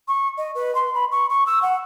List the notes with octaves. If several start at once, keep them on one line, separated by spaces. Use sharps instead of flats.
C#6
D#5
B4
C6
B5
C#6
C#6
E6
F#5